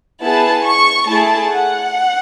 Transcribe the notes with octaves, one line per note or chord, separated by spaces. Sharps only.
B3 E4 G#4 A5
C#6
A3 E4 G#4 A5
F#5